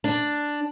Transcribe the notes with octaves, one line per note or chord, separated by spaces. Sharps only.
D4